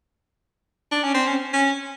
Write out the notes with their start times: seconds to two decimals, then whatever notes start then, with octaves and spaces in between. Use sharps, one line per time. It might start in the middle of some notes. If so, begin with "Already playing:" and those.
0.92 D4
1.04 C#4
1.15 C4
1.28 C#4
1.54 C#4